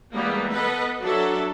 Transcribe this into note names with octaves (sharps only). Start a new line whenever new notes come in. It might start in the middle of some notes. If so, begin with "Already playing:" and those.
E3 G3 G#3 A#3 B3
B3 A4 B4 D#5
F#3 D4 F#4 A4 E5